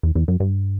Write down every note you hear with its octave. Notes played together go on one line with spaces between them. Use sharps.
E2
E2
F#2
G2